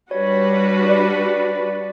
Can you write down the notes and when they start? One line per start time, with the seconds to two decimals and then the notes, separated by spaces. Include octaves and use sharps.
0.11 G3 D4 F#4 B4 C#5
0.89 D5